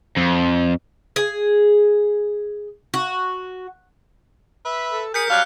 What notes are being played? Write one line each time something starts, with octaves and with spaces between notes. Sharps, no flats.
F2
G#4
F#4
B4 E5
A4
G#4 A#4 G6 B6 C#7
F#3 G3 D4 F5 F6 F#6